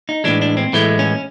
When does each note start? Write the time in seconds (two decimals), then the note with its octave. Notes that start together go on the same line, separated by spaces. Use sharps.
0.09 D#4
0.24 A2 E3 G#3 D4
0.42 D4
0.57 C4
0.73 A2 E3 G#3 A3
0.99 C#4